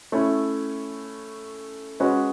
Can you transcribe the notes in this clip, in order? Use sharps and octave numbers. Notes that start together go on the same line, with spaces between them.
A3 C#4 E4
G#3 C#4 F#4 B4